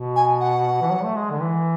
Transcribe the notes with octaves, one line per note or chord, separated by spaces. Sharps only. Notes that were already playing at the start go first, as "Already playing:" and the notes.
Already playing: B2
G#5
F#5
E3
F#3
A3
G#3
D3
E3